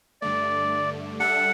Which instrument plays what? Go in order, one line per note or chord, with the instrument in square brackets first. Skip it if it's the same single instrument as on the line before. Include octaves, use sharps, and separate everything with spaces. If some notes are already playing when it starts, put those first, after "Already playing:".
[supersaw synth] G2 D3 A3 [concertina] D5
[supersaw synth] G3 D4 A4 E5 [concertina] F#5